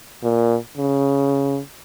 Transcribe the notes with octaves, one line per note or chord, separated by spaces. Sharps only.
A#2
C#3